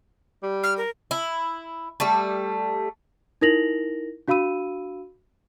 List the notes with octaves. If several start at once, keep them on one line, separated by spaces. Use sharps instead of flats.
G3
F6
A#4
E4
G3 A3
D#4 E4 A#4 A#6 F7 F#7
D4 F#4 F5 B5 E6 D#7